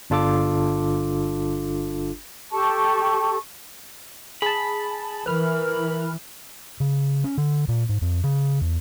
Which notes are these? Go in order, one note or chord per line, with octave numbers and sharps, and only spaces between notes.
G1 D4 F4 A4 D6
G4 A4 A5 C#6
G#4 A5 B5
E3 A#4 B4 F6
C#3
C#4
D3
A#2
G#2
F2
C#3
E2